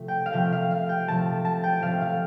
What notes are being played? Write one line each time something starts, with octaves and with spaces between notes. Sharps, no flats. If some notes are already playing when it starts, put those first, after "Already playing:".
Already playing: C3 F3 A3
G5
F5
C3 F3 A3 G5
F5
F5
G5
C3 F3 A3 A5
A5
G5
C3 F3 A3 F5
F5